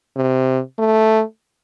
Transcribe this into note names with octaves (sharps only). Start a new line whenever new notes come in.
C3
A3